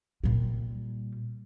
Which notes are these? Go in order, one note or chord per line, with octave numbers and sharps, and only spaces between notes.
A#2 G3